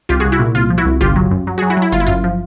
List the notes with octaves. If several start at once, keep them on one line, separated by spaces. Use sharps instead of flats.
C2 F4 G4
C2 F#4 G#4
E4 F#4
A#2
C2 F4
F3
E4 F#4
C2
G1 F4 G4
F#3
F#2
F#3
F#3 F#4 G#4
E4 F#4
F#3
E4
G1 F4
E4
F#2 F4
F3